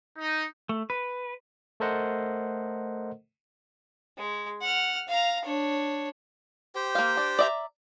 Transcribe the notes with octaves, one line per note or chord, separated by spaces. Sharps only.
D#4
A3
B4
A3 A4 A#4 C5 D#5 F#5
G#3
F#5 F6
F5 A#5
D4 C#5
G4 C5 G5
A#3 F5
D4
D5 E5 A#5